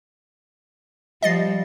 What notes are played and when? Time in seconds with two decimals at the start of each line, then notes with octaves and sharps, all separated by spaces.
1.23 F3 G3 D#5 A6 C7